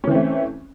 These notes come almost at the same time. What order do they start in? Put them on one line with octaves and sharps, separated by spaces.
C#4 E3 C4 A3